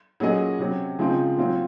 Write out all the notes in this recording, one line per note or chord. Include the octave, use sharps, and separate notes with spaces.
A#2 F#3 C#4 G#4 D#5
C3 F#3 C#4
C#3 F3 G#3 C4 F4
A#2 F#3 C4 F4